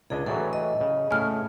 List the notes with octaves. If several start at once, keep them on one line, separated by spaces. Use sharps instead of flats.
C#2 D4 G#4 D#5
A2 E3 F#3 A4
D#5
C#3
A2 C#3 A3 C#5 G#5 F6